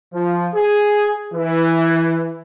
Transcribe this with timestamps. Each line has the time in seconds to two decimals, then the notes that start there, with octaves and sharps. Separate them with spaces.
0.13 F3
0.53 G#4
1.34 E3